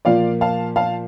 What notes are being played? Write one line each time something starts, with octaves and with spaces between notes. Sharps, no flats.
A#2 F3 A#3 D5 F5
F5 A5
F5 A5